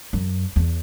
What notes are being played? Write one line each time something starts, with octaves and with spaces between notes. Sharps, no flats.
F#2
E2